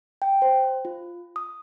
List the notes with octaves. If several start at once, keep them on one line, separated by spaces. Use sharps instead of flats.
G5
C5
F4
D#6